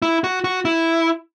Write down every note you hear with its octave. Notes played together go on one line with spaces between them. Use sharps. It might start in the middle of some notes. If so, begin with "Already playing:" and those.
E4
F#4
F#4
E4